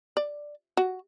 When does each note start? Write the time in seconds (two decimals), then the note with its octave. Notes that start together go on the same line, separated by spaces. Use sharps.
0.17 D5
0.77 F#4